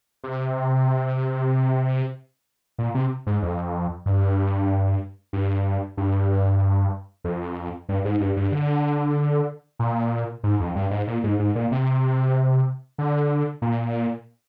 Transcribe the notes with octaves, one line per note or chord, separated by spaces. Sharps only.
C3
A#2
C3
G#2
F2
G2
G2
G2
F2
G2
G#2
G2
G2
D3
A#2
G#2
F2
G2
G#2
A#2
G#2
G#2
A#2
C3
D3
A#2